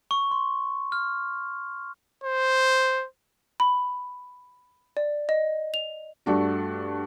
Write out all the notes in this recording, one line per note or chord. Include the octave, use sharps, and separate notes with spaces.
C#6
C6
F6
C5
B5
D5
D#5
F7
G2 A3 D4 F#4